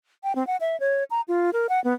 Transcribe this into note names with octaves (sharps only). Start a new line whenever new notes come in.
G5
C4
F#5
E5
C#5
A#5
F4
A#4
F#5
B3